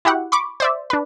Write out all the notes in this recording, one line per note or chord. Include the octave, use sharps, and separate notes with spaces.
E4 F#4 G4 F#5
B5 C#6 D6
C5 D5 E5
D4 B4